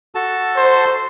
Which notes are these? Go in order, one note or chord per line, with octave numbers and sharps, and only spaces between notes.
F#4 A4 A5
C5